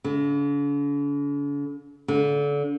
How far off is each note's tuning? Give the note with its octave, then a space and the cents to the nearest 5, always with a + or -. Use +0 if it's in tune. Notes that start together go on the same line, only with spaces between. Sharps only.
D3 -45
D3 -30